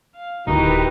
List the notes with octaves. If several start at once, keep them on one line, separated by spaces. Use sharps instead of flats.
F5
D1 D#3 D#4 E4 F#4 G4 B4